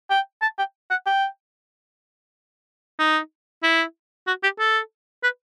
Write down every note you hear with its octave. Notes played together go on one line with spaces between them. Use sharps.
G5
A5
G5
F#5
G5
D#4
E4
F#4
G4
A4
B4